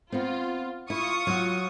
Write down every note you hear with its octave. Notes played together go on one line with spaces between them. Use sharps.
B3 C4 F4
E4 F4 C#6 D#6
F#3 F#4